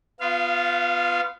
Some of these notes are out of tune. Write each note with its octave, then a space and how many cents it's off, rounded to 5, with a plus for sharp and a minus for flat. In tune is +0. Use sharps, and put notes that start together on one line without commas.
B3 +15 F4 +0 F5 -30